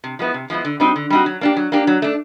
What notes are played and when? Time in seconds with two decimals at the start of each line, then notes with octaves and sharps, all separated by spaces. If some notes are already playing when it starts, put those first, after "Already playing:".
0.04 C3
0.19 F3 G#3 B3 E4
0.34 C3
0.50 F3 G#3 B3 E4
0.65 D3
0.80 G3 C4 D#4 F#4
0.96 D3
1.10 G3 C4 D#4 F#4
1.26 F#3
1.41 A#3 D4 G4
1.57 F#3
1.72 A#3 D4 G4
1.87 F#3
2.02 A3 D4